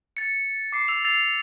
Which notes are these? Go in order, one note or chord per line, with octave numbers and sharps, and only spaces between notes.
A6 C#7
D6 C7
E6 F7
E6 A6 C7 F7